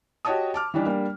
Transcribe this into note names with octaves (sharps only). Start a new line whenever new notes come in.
F#4 G4 C#5 D#5 A5 D#6
A5 D6 F6
E3 G3 D4 D#4
G3 A#3 D4